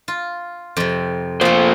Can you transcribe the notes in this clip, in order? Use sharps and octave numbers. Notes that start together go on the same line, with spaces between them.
F4
F2 C3
F3 A3 A#3 F4 C5